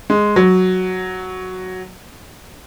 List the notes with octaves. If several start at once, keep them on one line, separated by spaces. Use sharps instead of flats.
G#3
F#3